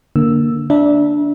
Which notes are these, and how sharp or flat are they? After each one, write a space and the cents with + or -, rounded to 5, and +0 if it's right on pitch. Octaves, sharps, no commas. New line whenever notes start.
D3 +0 A#3 +0 E6 +0
D4 +0 E5 -15 A#5 +45